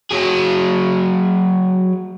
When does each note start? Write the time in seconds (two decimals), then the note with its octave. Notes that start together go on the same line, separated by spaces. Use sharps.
0.11 F#3 G#4